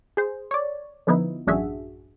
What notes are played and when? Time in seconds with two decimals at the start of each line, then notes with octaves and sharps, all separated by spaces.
0.17 G#4 C5
0.51 C#5 D5
1.07 D3 F3 B3 D#4 E4
1.47 A1 F#2 D4 F#4 G#4 E5